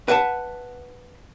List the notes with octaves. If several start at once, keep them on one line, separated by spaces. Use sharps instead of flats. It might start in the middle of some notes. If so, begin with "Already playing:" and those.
B4 E5 F#5 A5